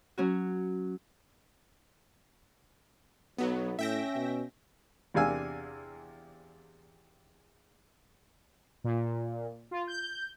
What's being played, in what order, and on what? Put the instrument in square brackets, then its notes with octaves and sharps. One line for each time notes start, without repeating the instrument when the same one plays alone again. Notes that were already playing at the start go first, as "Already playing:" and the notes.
[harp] F#3 C#4 F#4
[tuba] B1 [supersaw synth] F#3 B3
[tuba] A2 [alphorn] C#4 [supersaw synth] E5 G5 A#6
[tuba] B2
[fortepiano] E2 C3 D4 F5 G#5 E6
[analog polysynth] A#2
F4
G6